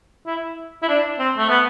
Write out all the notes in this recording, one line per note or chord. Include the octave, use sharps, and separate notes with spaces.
E4
E4
D4
C4
A3
B3